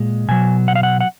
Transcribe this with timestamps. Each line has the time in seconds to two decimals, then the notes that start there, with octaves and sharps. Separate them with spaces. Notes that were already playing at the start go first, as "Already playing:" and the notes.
Already playing: A#2 G#3
0.28 B2 F#3 G#5
0.68 F#5
0.76 F5
0.83 F#5
1.01 F#5